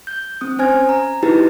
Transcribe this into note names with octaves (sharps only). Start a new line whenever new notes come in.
G6
C4 D#6
C#4 C5 G#5 F6 G#6
A#5
D#4 E4 F#4 G4 B4 A5